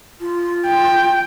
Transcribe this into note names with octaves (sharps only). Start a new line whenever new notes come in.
F4
G5